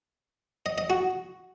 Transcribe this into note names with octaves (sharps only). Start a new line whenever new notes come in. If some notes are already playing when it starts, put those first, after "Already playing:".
D#5
D#5
F#4